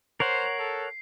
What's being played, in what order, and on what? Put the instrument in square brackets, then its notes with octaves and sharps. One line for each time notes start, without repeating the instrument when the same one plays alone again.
[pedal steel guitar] A#4 C#5 F#5 [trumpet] C5 [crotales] C7
[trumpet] A4